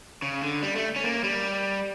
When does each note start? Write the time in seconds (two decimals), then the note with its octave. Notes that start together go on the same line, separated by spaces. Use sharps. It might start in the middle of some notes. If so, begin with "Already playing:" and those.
0.22 C#3
0.42 D3
0.62 G3
0.76 A3
0.96 C#4
1.04 A#3
1.24 G3